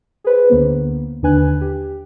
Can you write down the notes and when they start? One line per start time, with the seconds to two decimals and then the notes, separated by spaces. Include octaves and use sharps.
0.24 G#4 B4 C5
0.50 D2 D3 A#3 B3
1.22 D#2 D3 D4 B4 G#5 F#6
1.61 G4